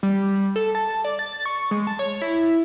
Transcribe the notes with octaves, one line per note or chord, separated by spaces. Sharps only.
G3
A4
A5
D5
A6
C#6
G#3
A5
C#5
E4